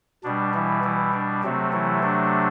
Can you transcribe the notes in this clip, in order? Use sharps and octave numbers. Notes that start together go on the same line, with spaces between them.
B2 G3 D4
E3 E4
E3 E4
D4
C3 F#3 A3 C4
E3 E4
D4